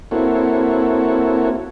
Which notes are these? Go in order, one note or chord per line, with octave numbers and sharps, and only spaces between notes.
A#3 C4 E4 F#4 A4 C#5